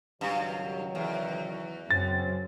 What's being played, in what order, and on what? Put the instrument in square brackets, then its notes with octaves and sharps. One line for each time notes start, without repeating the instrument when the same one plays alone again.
[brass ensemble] C#2 D#3 F#3 [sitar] G2
[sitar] E2
[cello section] F#2 [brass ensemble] C#3 C4 C#4 [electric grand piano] A6